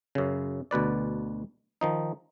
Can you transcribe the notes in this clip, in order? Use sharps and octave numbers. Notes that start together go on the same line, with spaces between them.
F#2 C#3
D2 B2 B4 D5
D#3 F3 D#4